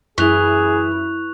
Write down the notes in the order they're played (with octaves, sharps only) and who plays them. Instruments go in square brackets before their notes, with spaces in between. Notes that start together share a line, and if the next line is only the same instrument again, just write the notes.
[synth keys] F#2 E4 [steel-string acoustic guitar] E3 [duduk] G#4 [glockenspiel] C#6 F#6 F7